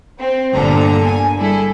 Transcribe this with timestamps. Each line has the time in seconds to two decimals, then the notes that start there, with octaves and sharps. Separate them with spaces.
0.19 C4
0.53 G1 A#2 D3 A4 A#5
1.05 G#5
1.38 G3 E4 G#4 A4